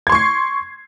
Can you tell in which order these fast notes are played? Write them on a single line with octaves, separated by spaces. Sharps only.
G#6 C6 C#6 C7